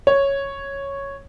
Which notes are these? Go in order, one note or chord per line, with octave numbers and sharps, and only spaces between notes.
C#5